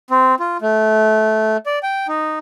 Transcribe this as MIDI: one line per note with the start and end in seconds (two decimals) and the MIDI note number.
0.10 0.35 60
0.40 0.57 65
0.62 1.57 57
1.66 1.79 74
1.83 2.07 79
2.08 2.39 63